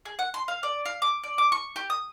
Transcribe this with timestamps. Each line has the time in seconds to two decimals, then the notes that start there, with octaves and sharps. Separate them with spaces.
0.05 G#4
0.19 F#5
0.34 C6
0.48 F5
0.63 D5
0.85 F5
1.02 D6
1.23 D5
1.38 D6
1.52 C#6
1.76 G4
1.90 D#6